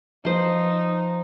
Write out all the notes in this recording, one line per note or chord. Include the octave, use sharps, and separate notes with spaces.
F3 D#4 C5